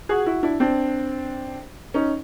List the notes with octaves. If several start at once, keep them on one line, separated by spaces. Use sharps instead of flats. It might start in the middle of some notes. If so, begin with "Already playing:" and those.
F#4 G#4
E4 F#4
D4 E4
C4 D4
C#4 D#4